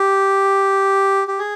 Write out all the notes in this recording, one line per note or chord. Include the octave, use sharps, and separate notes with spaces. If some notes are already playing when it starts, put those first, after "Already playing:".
Already playing: G4
G4
G#4